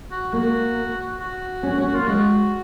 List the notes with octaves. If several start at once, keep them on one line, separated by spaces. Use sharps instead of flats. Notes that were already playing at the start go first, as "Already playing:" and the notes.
F#4
A#3 F#4
F#4
C#4
C#4
A#3
F4
G#3 F#4